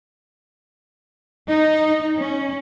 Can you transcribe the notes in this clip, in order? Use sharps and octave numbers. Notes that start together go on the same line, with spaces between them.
D#4
C#4